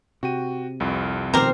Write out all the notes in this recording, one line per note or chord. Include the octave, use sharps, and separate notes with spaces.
C3 F#4 G5 D#7
C2 F2
B2 D#3 F3 C4 G4 A#4 C5